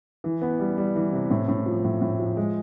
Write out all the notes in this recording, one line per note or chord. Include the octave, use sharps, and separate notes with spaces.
E3
B3
G3
G3
E3
C3
A2
A2
F3
A2
A2
F3
G#3